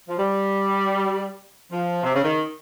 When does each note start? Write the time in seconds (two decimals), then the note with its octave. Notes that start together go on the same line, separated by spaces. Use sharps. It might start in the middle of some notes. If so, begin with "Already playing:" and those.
0.08 F3
0.17 G3
1.71 F3
2.03 C3
2.13 C#3
2.22 D#3